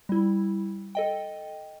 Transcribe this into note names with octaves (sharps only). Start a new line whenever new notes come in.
G3 E4
A4 D#5 G5